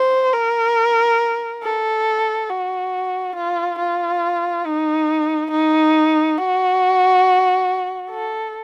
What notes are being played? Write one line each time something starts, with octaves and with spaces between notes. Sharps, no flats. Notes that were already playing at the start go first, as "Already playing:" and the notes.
Already playing: C5
A#4
A4
F#4
F4
F4
D#4
D#4
F#4
A4